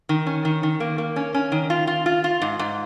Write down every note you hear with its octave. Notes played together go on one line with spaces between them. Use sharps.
D#3
C#4
D#3
D#3
A#3
A#3
C#4
C#4
D#3
F4
F4
F4
F4
G#2
G#2